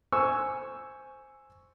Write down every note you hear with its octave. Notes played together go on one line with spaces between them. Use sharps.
C5 G#5 C#6 E6